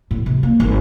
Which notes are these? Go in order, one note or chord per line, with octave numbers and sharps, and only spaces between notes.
A2
C3
A#3
G#1